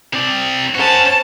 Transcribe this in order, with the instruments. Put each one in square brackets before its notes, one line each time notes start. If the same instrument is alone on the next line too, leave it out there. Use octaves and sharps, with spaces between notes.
[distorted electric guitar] C4 D5
[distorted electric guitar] C#4 F#4 [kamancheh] C5 A5